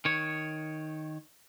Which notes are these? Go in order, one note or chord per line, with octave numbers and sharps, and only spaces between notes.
D#3 C#5